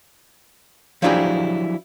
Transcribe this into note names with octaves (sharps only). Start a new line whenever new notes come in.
F3 F#3 D4 E4 G4 G#4